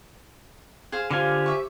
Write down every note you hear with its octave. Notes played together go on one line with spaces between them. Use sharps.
G#4 C5 F5
D3 F4 G4 C5 F5 G#5
E5 C#6